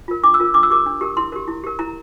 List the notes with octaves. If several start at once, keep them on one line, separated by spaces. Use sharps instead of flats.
F4 A#4
D4 D6
E6
F4 A#4
D4 D6
E6
G4 A#4 D6
D4
G4 A#4
E4 C6
G4 A#4
E4
G4 A#4
E4 A#5